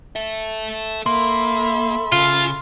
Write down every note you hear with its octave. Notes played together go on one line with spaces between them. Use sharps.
A4 E5
A#3 A4 E5 B5 C6
C#3 F4